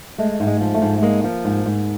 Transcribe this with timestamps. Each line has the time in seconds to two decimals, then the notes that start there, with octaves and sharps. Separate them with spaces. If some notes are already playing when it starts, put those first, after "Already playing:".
0.18 G#3 A3
0.40 G#2
0.47 G#3
0.61 F3
0.74 A3
0.82 G#2
1.02 G#3 A#3
1.24 F3
1.45 G#2
1.66 G#2